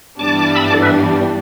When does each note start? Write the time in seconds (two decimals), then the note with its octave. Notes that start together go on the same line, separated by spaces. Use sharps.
0.19 G2 E3 G3 B3 D4 A5 D6
0.55 B5 E6
0.64 A5 D6
0.73 A4 D5
0.82 B4 E5